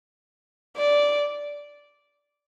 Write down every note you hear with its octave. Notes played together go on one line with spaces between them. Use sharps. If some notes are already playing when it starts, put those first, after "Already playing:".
D5